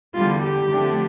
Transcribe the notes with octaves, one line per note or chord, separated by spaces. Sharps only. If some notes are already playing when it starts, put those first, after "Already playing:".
E2 D3 G3 F4
G4
F2 D3 A3 D4